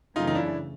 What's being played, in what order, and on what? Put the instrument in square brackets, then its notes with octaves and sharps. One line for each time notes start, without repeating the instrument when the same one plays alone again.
[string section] F#2 C#3 E3 A3 [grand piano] D#4 F4
[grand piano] D#4
D4 E4